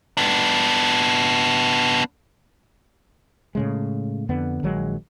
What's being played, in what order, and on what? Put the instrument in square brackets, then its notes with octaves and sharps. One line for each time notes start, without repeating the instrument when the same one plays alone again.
[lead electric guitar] B3 D4
[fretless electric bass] A2 C#3 G#3
F2 D3 B3
A#1 D#3 F#3 G#3